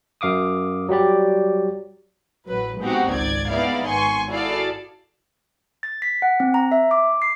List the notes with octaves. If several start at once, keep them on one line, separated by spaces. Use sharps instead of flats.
F#2 F5 D6 D#6
F#3 G3 G4 D5
A1 F#3 B4
G#3 B3 C4 D#4 F#4 G4
G#1 C#2 D5 G#6
G#3 B3 D#4 E4 D5 F5
G#1 G#5 C6 C#6
E4 F#4 G#4 A4 D5 F5
A6
B6
F#5
C4
A#5
E5
D6
C7